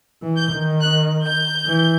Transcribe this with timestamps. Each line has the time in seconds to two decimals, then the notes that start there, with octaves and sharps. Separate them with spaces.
0.22 E3
0.36 G6
0.52 D#3
0.80 F#6
1.24 G6
1.67 E3